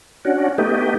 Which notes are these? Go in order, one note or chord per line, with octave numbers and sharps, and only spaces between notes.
C#4 D4 F#4
A3 B3 D#4 G4